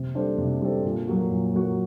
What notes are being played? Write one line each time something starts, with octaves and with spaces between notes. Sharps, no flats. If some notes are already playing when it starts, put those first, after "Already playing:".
Already playing: C3
G3 D4 A4 C5
C3
G3 D4 A4 C5
A#2
F#3 A#3 F#4
A#2
F#3 A#3 F#4